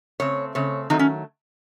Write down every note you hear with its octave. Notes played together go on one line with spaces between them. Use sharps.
C#3 A3 C4 C#5
C#3 A3 C4 C#5
D#3 F#3 A3 C4 D#4
C#4